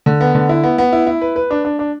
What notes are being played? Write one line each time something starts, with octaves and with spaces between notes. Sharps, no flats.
D3
B3
D3
E4
B3
B3
E4
E4
B4
B4
D4
D4
D4